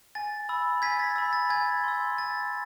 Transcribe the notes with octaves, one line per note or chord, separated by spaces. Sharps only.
G#5 A6
B5 E6
G#5 G#6 B6
A6
B5 E6
A6
G#5 G#6
C6 E6
G#5 A6